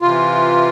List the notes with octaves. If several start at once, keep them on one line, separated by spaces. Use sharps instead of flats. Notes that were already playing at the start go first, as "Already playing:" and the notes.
C3 E3 F4